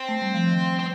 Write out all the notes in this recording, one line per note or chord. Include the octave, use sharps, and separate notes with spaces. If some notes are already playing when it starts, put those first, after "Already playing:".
Already playing: C4
A3
G3
F3
D#3
C4